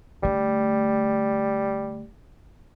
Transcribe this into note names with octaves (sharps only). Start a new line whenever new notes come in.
D3 G3 A3